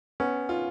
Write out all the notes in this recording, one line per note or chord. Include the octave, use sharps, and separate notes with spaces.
B3 C#4
F4